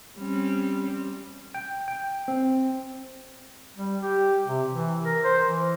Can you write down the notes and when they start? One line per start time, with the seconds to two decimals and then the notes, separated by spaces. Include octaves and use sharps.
0.18 G3 C4 C#4
1.55 G5
1.88 G5
2.28 C4
3.76 G3
4.02 G4
4.47 C3
4.70 E3
5.04 A#4
5.24 C5
5.44 E3